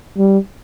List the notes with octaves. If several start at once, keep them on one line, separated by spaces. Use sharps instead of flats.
G3